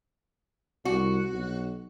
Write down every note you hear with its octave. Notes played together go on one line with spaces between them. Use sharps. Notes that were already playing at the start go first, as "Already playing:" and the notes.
C2 F#4
B1